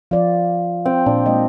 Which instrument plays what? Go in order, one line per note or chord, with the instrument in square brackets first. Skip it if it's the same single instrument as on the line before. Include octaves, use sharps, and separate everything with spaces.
[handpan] F3 D5 [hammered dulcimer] F4
[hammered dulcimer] C4 G5
[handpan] A#2 [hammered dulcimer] D4
[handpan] G#3 A#3 D#5